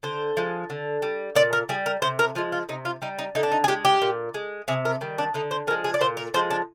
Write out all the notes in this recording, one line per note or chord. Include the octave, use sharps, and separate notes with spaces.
D3 C5
F3 G#3
D3
G3
A#2 D5
A#4
G3 G#4
A#4
C3 C5
A#4
F3 G#3 F4
F4
C3 D#4
F4
G3 D#4
D#4
D3 D#4
D4
D#4
G#4
G#3 G4
G4
A#2
G#3
C3 G#4
A#4
D#3 G3
D4
D3 D#4
C5
F3 G#3 A#4
G#4
D5
A#2 C5
A#4
F3 G#3 C5
D4